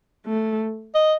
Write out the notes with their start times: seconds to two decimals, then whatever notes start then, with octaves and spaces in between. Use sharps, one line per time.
0.26 A3
0.95 D#5